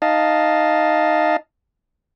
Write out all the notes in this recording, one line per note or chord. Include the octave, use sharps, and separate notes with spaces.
D#4 D#5 F5 A5